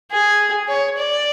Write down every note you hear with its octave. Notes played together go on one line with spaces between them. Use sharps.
G#4
C#5
D5